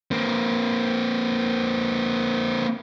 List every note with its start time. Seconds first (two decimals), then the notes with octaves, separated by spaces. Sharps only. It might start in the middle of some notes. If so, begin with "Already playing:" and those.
0.11 A#3 C4